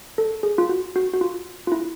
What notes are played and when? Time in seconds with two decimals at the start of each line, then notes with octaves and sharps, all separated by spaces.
0.18 A4
0.43 G#4
0.58 F4
0.69 F#4
0.96 F#4
1.13 F#4
1.21 F4
1.67 F4
1.72 E4